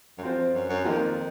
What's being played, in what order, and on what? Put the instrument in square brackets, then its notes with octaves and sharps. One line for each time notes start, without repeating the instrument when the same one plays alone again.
[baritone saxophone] F#2
[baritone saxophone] F2 [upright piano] C4 F4 C5
[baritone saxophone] F2
F#2
F#2
[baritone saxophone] F2 [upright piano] D#3 A#3 F4 A#4